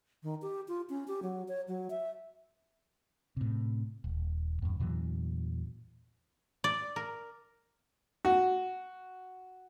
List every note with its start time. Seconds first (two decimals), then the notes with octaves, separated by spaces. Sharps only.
0.23 D#3
0.42 G4
0.68 F4
0.89 C#4
1.08 G4
1.22 F#3
1.48 C#5
1.68 F#3
1.90 E5
3.37 A2 C3
4.04 D#1
4.62 E2 G2
4.80 E2 A#2 E3 F#3
6.64 D5
6.96 A#4
8.25 F#4